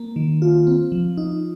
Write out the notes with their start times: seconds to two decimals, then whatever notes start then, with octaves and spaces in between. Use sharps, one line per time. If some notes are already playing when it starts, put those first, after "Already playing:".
Already playing: A#3
0.16 D#3
0.42 F4
0.67 C4
0.92 F3
1.18 D#4